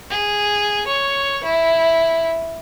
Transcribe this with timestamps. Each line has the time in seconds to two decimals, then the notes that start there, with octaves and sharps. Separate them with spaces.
0.10 G#4
0.87 C#5
1.44 E4